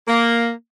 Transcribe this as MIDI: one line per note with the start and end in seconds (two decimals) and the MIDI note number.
0.08 0.49 58